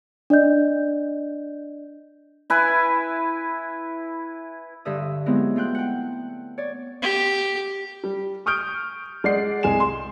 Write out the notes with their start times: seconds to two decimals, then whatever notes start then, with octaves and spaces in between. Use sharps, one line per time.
0.30 D4 D5 D#5 G6
2.50 E4 B4 G#5
4.85 G2 D3 E5 D#6
5.26 F#3 G#3 B3 C4 E4
5.56 A3 F4 G5 F#6
5.75 F#5 G5
6.58 C#5 D5
7.02 G4
8.04 G3
8.46 C#6 D#6 F6 G6 D7
9.24 G#3 D5 F#5 C7
9.63 C2 G#3 G#5 E7
9.80 C6